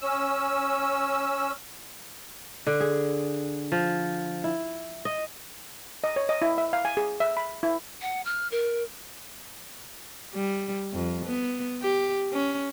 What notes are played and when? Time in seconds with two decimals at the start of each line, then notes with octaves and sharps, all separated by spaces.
0.01 C#4 E6
2.67 D3
2.80 G#4
3.72 F3
4.44 E4
5.05 D#5
6.04 D#5
6.16 C#5
6.29 D#5
6.42 E4
6.58 E5
6.73 F5
6.85 G#5
6.97 G#4
7.20 E5
7.37 B5
7.63 E4
8.02 F#5
8.25 F6
8.52 A#4
10.34 G3
10.93 F2
11.25 B3
11.82 G4
12.32 C#4